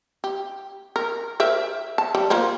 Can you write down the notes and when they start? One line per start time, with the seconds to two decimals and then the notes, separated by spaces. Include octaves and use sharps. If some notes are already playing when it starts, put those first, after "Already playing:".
0.24 G4
0.96 A#4
1.40 A#4 C5 E5
1.98 A5
2.15 G3
2.30 A#3 F4 C5